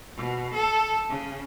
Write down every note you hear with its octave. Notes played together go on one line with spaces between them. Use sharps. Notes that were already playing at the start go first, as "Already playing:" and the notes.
B2
A4
C#3